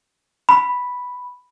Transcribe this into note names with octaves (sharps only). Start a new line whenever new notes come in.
B5